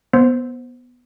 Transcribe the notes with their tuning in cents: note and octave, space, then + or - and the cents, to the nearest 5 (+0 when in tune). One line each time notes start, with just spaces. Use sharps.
B3 -10 C5 +0